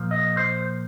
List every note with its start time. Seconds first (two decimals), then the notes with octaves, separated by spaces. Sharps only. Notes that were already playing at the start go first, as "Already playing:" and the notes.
Already playing: A#2 F3
0.11 D#5
0.37 C5